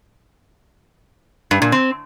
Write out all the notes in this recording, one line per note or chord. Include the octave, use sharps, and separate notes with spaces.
G2
A#2
C4